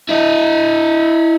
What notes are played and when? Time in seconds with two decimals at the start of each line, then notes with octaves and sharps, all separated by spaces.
0.09 E4 D#5